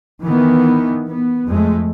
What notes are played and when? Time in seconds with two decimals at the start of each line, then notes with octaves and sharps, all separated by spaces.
0.23 D#3 E3 B3
1.08 B3
1.49 F2 G#3 A3